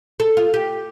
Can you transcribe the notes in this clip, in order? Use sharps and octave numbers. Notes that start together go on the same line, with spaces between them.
A4
F4
G4